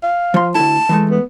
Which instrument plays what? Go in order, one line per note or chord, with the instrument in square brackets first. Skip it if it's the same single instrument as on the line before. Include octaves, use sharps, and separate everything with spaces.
[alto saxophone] F5
[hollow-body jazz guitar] F3 C6
[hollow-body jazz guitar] D2 E4 [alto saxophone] A5
[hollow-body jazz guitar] E3 G#3 A3
[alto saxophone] B3